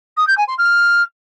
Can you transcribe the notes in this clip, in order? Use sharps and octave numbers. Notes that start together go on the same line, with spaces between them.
D#6
G6
G#5
C6
F6